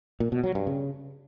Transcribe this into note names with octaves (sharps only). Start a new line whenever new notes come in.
A#2
B2
F#3
G2
C#3